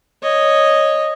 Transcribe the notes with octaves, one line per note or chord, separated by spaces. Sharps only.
C#5 D#5